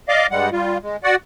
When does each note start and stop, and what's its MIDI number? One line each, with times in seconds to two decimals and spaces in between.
0.08 0.27 74
0.08 0.27 75
0.08 0.27 77
0.08 0.27 86
0.31 0.50 43
0.31 0.50 55
0.31 0.50 56
0.31 0.50 78
0.52 0.78 55
0.52 0.78 65
0.83 0.97 56
1.04 1.16 66
1.04 1.16 74
1.04 1.16 78